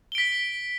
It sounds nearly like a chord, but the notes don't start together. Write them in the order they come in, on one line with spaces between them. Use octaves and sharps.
G7 D7 B6